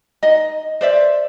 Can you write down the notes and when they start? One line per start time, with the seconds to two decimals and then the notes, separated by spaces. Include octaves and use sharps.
0.23 D#4 D#5
0.81 C5 D5 E5